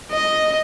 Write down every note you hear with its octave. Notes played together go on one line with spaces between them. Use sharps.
D#5